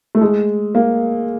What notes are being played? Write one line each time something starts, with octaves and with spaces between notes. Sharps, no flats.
A3
G#3
A#3